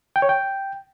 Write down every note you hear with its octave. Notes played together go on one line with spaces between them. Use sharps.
G5
C#5
G5